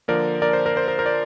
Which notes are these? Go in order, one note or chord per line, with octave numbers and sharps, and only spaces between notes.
D3 F3 A#3 A#4 D5
A#4 D5
C5
A#4
C5
A#4
A#4
D5